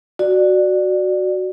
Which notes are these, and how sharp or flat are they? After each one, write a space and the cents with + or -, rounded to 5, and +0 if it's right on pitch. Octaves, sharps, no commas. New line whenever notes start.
F#4 +0 D5 +15